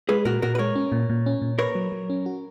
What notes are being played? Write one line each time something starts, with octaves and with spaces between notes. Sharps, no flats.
G#3 G#4 B4
A#2 F#4 A#4
A#2 F#4 A#4
B4
G#3 A#4 C#5
C#4
A#2
A#2
C#4
A#2
A#4 B4 C#5
F#3
F#3
C#4
F#4